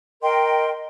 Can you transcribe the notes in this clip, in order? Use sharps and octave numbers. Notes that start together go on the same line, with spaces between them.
A#4 D#5 G5 C6